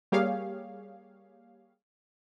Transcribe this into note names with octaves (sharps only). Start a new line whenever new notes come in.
G3 A#3 G4 G#4 C#5 F5